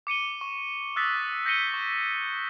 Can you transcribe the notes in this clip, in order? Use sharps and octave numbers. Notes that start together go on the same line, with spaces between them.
D6 C#7 D#7 G7
C#6
D#6 E6 F#6 A6 B6
G6 A#6 B6 C#7 D#7 G7
C#6